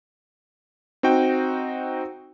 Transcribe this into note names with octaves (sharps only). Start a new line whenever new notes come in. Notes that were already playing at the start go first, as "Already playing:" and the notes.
C4 D#4 F#4 G5